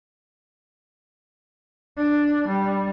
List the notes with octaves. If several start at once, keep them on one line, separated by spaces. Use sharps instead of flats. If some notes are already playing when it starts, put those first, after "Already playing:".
D4
G3